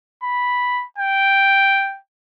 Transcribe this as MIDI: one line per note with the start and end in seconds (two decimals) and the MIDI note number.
0.23 0.85 83
0.98 1.98 79